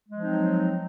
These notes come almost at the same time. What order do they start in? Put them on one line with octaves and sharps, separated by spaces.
G#3 F3 C4 D#4 F#3